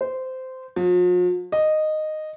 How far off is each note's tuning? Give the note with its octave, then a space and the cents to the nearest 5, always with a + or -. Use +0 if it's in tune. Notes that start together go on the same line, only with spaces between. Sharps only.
C5 -15
F3 +45
D#5 -10